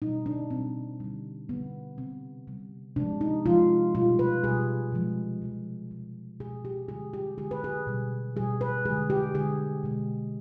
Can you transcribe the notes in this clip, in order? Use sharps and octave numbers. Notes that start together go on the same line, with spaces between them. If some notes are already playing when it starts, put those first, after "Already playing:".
B2 G3 D#4
D4
B2 G3 C4
D3 G3
D3 G3 B3
C3 G3 C4
C3 G3
C3 F3 G#3 D4
D#4
C3 F3 G#3 F4
B2 G3 F4
B4
B2 G3 G#4
C3 F3 G#3
C3 F3 G#3
B2 G#3
B2 G#3 G#4
G4
D3 G#3 G#4
G4
D3 G#3 G#4
B4
G#4
B2 G3
B2 G3 G#4
B4
D3 G#3 G#4
G4
D3 G#3 G#4
B2 G#3